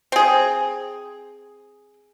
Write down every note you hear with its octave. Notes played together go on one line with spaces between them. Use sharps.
C4 G#4